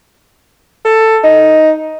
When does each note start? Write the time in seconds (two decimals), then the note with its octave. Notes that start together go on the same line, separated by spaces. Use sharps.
0.85 A4
1.24 D#4